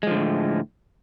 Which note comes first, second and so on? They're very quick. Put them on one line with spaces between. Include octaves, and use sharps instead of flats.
G#3 F3 D3 A2